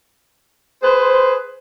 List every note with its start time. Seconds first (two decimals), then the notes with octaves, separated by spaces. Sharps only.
0.83 G#4 B4 C5